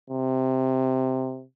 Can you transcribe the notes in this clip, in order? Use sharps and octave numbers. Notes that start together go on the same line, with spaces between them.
C3